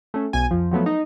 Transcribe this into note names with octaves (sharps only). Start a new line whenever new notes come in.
A3 C#4
B1 G#5
F2 F3
F3 F#3 A3 B3
D#4